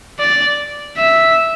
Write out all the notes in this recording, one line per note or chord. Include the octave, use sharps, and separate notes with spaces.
D5
E5